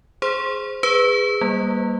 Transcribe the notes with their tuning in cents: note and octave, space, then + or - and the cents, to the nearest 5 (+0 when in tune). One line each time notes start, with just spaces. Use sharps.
G#4 +5 C5 -5 C6 +10
G#4 -15 B4 +5
G3 +0 A#3 +15